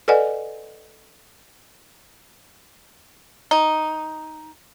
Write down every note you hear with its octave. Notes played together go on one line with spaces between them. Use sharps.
A4 B4 D5 D#5 F#5 G#5
D#4